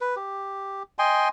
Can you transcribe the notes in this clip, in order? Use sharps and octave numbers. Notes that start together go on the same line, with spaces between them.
B4
G4
D#5 G5 G#5 C6